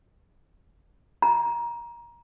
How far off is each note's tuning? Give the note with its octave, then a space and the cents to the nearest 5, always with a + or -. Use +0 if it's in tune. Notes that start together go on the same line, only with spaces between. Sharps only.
A#5 +20